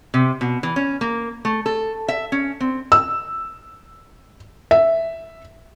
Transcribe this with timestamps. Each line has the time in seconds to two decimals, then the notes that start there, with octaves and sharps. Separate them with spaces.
0.14 C3
0.41 B2
0.63 E3
0.76 C#4
1.01 A#3
1.45 A3
1.66 A4
2.08 E5
2.32 C#4
2.61 C4
2.92 E6
4.71 E5